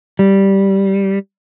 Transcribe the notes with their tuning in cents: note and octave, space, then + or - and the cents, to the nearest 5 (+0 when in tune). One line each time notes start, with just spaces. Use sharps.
G3 -5